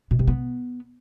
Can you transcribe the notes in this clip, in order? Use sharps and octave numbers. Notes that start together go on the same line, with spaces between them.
B2
C3
B3